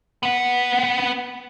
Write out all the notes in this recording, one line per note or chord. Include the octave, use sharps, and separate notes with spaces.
B3 F#5